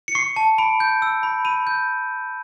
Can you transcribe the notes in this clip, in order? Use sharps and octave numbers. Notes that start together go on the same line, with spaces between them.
C#7
C#6 C7
A5
B5 D7
G6
E6
B5
B5 D#7
G6